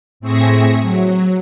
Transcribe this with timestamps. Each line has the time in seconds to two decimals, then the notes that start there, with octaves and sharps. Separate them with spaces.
0.20 A2 C4 G#4 E5 C#6 A#6
0.81 F#3